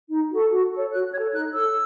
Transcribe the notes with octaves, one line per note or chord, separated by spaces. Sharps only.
D#4
F#4 A4
F#4
A4 C#5
F#4 F#6
A4 C#5 G#6
D#4 F#6
A4 C#5 E6